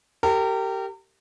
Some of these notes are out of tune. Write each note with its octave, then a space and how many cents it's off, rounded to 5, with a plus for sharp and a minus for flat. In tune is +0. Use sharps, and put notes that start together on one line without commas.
G4 -15 A#4 -35